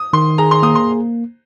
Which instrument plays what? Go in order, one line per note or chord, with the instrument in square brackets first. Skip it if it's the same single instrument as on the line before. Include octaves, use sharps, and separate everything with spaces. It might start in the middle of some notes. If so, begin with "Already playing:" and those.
Already playing: [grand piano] D#6
[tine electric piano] D#3 [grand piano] C6
[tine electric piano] G#4 [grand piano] A#5
[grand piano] C6
[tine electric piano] A#3 [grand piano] D#6
[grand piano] C6